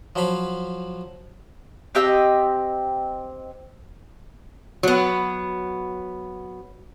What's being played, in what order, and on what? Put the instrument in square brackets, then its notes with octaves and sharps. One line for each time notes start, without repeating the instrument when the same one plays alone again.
[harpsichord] F3 F#3 F5 B5
[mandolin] C4 G4 D#5 E6
[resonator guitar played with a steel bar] F#3 B3